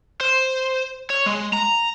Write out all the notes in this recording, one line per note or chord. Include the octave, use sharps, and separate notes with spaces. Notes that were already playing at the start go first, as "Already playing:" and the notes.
C5
C#5
G#3
A#5